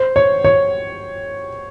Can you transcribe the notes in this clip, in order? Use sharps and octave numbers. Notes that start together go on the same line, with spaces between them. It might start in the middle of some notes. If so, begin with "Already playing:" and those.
Already playing: C5
C#5
C#5